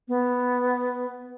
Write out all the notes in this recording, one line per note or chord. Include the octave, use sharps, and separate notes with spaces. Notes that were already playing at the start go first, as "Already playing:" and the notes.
B3